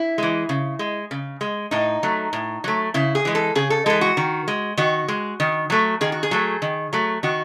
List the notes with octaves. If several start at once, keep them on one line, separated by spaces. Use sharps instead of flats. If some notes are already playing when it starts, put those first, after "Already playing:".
Already playing: E4
E3 G#3
C#3
G#3
C#3
G#3
A2 D#4
F#3 A3
A2
F#3 A3
C#3 E4
G#4
E3 G#3
A4
C#3 G#4
A4
E3 G#3 A4
F#4
D#3
G#3
D#3 F#4
G#3
D#3
F#3 A3
D#3 G#4
F#4
G#4
F#3 A3
D#3
F#3 A3
D#3 F#4